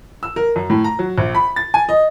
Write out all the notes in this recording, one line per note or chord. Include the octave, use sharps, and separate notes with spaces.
E6
A#4
F#2
A2
A#5
F#3
A#1
B5
A6
G#5
D#5